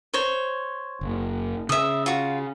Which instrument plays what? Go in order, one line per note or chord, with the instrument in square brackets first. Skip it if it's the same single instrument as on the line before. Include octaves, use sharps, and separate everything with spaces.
[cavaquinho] C5 C#5
[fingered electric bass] F#1
[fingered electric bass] C#3 [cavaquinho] E5 D#6
[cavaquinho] F4 F#4